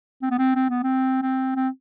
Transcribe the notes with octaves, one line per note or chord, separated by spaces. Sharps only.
C4
B3
C4
C4
B3
C4
C4
C4